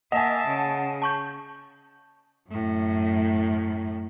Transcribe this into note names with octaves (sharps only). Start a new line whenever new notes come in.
A#3 D#5 E5 F#5 G#5 A5
C#3
A5 C#6 G6
F#2 A2